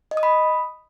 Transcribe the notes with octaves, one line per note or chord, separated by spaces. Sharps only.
D#5
D#6
B5